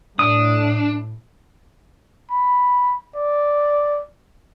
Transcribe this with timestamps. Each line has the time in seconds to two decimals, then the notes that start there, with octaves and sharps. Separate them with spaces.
0.19 A2 D4 D#6
2.30 B5
3.16 D5